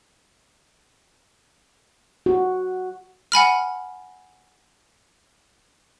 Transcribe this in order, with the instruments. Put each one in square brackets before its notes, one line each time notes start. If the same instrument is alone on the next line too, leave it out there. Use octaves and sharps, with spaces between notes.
[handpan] F#4
[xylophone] F#5 G#5 B5 F6